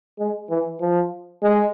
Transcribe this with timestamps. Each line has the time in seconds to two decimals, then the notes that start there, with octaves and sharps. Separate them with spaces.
0.19 G#3
0.50 E3
0.81 F3
1.43 G#3